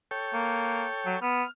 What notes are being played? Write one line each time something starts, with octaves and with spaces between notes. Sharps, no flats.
A4 C#5 G5
A#3
F#3
B3 F6